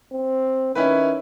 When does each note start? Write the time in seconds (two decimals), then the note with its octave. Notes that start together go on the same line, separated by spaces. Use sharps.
0.12 C4
0.75 D#3 C#4 E4 B4